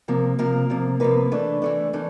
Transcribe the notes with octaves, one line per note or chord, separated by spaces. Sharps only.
C3 F3 A#3
C3 F3 A#3 A#4
C3 F3 A#3
C3 F3 A#3 B4
E3 A3 D4
E3 A3 D4
E3 A3 D4